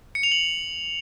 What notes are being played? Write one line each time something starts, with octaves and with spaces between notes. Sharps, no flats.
C#7
F7
F#7